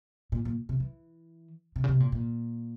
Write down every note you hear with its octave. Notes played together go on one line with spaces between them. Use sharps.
A#2
A#2
C3
E3
C3
C#3
C3
A#2
A#2